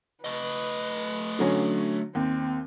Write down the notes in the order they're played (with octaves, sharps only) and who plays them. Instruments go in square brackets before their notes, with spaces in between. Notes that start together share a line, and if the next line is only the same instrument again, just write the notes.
[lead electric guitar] A3 D#5 [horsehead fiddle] B4
[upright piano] D3 F#3 C#4
[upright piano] D#2 [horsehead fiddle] C4